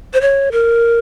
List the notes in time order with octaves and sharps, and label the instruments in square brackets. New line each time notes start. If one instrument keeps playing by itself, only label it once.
[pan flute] C5
C#5
A#4